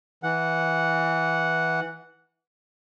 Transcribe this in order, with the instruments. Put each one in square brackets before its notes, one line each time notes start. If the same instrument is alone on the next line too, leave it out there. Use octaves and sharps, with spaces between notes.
[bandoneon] E3 F#5